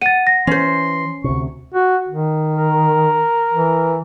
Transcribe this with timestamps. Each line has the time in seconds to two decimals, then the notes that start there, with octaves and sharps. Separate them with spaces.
0.02 F#5 A6 D#7
0.27 A#6
0.47 E3 C#4 C5 C6
1.24 D2 C3 C#6
1.74 F#4
2.08 D#3
2.57 A#4
3.53 E3